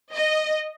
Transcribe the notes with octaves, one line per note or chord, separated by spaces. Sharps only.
D#5